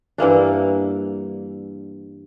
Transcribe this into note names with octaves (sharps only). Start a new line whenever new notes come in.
G2 E3 A#3 D4